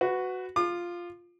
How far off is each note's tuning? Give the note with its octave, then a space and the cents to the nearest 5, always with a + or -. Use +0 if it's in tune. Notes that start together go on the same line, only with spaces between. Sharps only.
F#4 +0 B4 +20
F4 +0 D6 +45